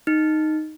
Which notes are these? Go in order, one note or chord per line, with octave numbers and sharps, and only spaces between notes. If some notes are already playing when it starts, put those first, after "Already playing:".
D#4